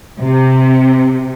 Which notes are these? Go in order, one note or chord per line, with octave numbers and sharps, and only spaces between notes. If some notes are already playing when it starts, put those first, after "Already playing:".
C3